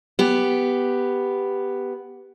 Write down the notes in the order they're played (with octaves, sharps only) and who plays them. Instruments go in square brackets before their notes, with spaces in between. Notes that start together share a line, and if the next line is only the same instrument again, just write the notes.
[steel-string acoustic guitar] B3 G4